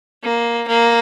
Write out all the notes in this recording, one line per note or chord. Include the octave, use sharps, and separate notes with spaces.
A#3
A#3